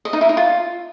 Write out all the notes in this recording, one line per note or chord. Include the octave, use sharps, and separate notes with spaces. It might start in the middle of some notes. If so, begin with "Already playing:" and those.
D#5
D#4
E4
D#4
F4